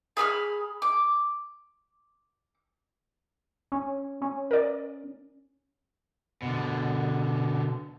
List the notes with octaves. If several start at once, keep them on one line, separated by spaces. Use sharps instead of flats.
G#4 B5 D#6 F6
D6
C#4
C#4
A#4 D5
B2 D3